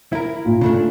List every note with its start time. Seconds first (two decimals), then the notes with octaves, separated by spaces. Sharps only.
0.13 E4 A#4
0.45 A#2 F4
0.61 C#3 A3 D4